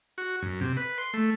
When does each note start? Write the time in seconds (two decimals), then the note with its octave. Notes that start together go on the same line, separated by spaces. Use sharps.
0.18 F#4
0.42 F#2
0.61 C3
0.77 B4
0.98 C6
1.14 A3